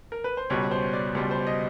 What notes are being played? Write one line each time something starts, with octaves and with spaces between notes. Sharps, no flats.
A#4
B4
C5
C#2 B2 G3 C#5
C5
D5
C#2 B2 G3
C5
D#5